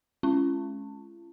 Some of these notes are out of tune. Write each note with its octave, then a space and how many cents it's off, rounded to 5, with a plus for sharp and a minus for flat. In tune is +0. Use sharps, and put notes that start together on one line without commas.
G#3 +20 C#4 -10 F4 -45